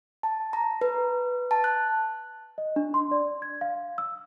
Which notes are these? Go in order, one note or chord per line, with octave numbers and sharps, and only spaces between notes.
A5
A#5
B4
A5
F#6
D#5
D4
C6
D5
G#6
F5
E6